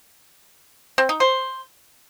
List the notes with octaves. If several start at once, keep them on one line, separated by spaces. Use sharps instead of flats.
C4
D#4
C5